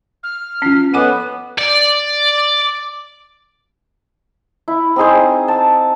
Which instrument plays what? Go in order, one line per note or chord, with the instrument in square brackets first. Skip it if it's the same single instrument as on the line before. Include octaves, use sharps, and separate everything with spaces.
[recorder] F6
[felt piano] F3 C7 [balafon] C#4
[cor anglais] B3 [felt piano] A4 C#5 [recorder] D#5 [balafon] F#5 G#5 D6
[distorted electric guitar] D5
[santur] E4
C4 D#4 G#4 C5
A5